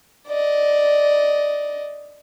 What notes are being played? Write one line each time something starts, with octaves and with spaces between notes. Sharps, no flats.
D5 D#5